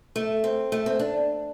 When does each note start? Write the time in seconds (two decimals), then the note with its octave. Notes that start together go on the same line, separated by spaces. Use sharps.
0.16 A3
0.44 C4
0.72 A3
0.86 C4
0.99 D4